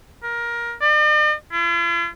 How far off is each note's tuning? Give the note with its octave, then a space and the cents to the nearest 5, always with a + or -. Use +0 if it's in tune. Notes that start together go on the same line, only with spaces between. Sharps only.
A#4 +20
D5 +45
F4 -45